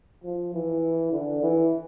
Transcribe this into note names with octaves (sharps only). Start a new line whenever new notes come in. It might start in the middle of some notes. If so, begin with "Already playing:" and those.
F3
E3
D3
E3